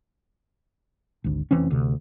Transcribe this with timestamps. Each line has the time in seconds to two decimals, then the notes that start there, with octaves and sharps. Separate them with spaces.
1.24 G#1 D2
1.51 F1 E3 C4 C#4
1.71 D2 C3